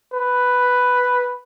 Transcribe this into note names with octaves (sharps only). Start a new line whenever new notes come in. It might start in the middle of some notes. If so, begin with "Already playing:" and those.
B4